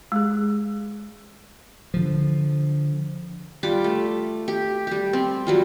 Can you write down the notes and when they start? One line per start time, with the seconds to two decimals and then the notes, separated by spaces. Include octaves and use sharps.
0.12 G#3 G#4
1.94 D3 F3
3.63 G3 F4 D6
3.84 A3
4.48 G4
4.87 G3 G4
5.13 C4
5.47 F#3 G3 F4